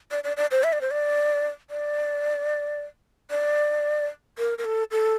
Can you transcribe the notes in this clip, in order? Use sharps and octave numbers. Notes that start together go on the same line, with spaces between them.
D5
D5
D5
C5
E5
D5
C5
D5
D5
D5
A#4
A#4
A4
A4